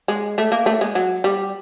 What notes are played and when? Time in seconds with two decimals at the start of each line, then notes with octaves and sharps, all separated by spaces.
0.08 G#3
0.38 A3
0.52 A#3
0.66 A3
0.81 G#3
0.95 F#3
1.24 G3